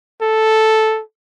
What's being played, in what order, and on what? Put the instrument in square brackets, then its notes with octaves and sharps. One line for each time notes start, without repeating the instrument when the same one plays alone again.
[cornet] A4